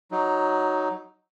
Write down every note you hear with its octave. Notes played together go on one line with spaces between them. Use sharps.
F#3 D#4